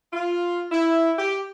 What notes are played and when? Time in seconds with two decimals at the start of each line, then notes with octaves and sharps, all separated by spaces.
0.13 F4
0.72 E4
1.19 G4